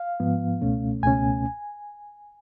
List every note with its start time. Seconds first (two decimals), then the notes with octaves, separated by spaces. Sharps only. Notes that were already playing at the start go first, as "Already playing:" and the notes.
Already playing: F5
0.20 G#2 F3 B3
0.61 C#2 B2 A3 C#4
1.02 C#2 B2 A3 C#4 G#5